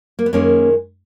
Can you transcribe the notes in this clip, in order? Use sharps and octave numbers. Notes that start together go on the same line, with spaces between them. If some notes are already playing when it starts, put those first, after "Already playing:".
A#3
B3
F#2 D#3 G#3 A#3 C#4